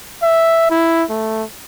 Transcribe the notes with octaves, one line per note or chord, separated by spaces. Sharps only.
E5
E4
A3